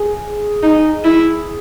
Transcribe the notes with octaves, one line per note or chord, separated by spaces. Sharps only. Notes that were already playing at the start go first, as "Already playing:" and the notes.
Already playing: G#4
D#4
E4